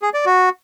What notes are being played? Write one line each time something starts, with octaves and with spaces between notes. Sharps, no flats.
G#4
D5
F#4